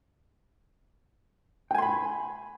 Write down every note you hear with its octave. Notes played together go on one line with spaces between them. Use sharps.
G5 G#5 B5 C6